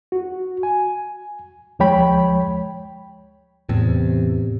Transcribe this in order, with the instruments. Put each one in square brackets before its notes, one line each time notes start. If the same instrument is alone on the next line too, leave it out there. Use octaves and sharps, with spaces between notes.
[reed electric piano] F#4
G#5
D2 F3 G#3 C#5 G5 B5
[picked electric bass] E2 [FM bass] A2 [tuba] C3